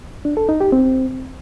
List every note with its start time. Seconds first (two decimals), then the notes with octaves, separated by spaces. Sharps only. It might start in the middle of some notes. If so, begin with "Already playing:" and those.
0.25 D4
0.37 A4
0.49 D#4
0.61 G4
0.72 C4